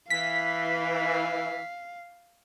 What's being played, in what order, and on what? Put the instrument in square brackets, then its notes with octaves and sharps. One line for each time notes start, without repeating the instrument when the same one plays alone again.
[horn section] E3 [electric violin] F5 [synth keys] B6